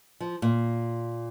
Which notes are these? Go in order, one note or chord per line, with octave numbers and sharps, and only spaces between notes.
F3
A#2